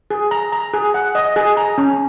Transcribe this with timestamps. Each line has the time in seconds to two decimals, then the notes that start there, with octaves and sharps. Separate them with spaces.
0.11 G#4
0.31 A#5
0.52 A#5
0.74 G#4
0.94 F#5
1.15 D#5
1.36 G#4
1.57 A#5
1.78 C#4